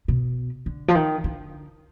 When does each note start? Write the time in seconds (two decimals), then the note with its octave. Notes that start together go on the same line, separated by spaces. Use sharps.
0.08 B2
0.66 D3
0.88 F3
0.95 D#3
1.24 D3